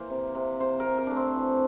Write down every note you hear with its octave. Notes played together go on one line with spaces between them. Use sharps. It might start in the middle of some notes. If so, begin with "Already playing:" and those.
Already playing: E3 A#3 C5
C3
C3
C3 C5
A#4
C3
A#4
A3 D4
C4
E3